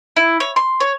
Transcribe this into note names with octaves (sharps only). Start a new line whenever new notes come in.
E4
C#5
C6
C#5